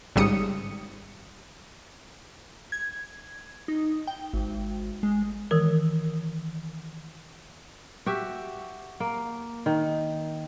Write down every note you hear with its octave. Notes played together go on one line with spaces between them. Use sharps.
G#1 C#3 G3 D#6 C#7
G#6
D#4
G5
G#1
G#3
D#3 E3 A#4
F#4 G4 E5
A#3
D#3